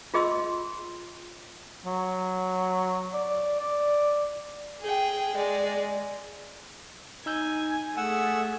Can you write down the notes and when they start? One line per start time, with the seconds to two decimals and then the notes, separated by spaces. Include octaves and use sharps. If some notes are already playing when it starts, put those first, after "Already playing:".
0.14 F4 G#4 D#5 C6 E6
1.86 F#3
3.13 D5
3.60 D5
4.81 G#4 G5
5.35 G#3 D5
7.26 D#4 G#5 E6 G6
7.97 A3 G#4 F#5 G#5 E6